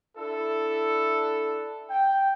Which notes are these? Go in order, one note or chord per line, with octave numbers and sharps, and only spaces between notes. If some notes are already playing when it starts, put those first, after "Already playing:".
D4 E4 A4
G5